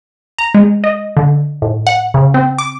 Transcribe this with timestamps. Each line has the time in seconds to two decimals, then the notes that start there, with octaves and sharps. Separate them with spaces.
0.39 A#5
0.55 G#3
0.84 D#5
1.17 D3
1.62 A2
1.87 F#5
2.14 C#3
2.34 C4
2.58 D6